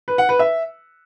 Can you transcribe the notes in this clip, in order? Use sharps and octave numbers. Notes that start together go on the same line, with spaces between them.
B4
F#5
B4
E5